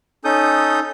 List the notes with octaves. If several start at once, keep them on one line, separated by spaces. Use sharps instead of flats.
C#4 D#4 A4 D#6 G6